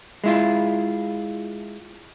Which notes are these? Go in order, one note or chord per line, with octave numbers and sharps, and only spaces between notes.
G#3 E4 F4